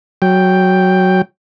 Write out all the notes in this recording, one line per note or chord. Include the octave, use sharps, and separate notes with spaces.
F#3 G5